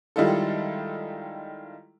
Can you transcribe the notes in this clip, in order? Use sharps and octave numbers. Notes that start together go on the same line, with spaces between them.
D#3 G3 G#3 E4 F4 A4